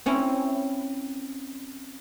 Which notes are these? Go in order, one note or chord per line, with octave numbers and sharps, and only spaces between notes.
C4 C#4 E4